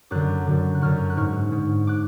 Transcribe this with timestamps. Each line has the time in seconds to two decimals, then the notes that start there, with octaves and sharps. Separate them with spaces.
0.11 F#2 D3 D6 F#6
0.47 F#2 D3
0.75 F#6
0.81 F#2 D3 C#6 F6
1.10 F#6
1.17 G#2 C#6 F6
1.52 G#2
1.87 D6 F#6